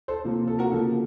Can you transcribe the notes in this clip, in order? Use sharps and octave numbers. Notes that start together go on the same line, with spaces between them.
A4 C5
C3 F3 A#3
A4
F#4 A#4
C#3 F3 A#3 A4